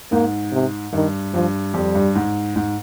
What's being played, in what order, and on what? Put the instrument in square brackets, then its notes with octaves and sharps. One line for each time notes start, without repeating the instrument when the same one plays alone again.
[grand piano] G#2 [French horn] A#3
[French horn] C3
[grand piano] G2 [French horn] D#3
[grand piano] G2 [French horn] F3
[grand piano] F2 [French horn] G3
[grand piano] G2
G#2
G#2